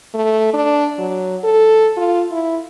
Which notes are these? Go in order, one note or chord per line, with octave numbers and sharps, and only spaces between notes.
A3
D4
F#3
A4
F4
E4